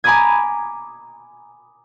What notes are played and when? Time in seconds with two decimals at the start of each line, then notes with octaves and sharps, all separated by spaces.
0.04 G#5 A#5 B5 D6 D#6 G#6